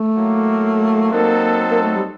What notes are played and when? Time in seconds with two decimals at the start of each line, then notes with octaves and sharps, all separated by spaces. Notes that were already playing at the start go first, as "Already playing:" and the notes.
Already playing: A3
0.16 A2 F#3 A#3
1.11 F#3 A#3 C4 D#4 A4
1.70 A#3
1.82 A3
1.95 G3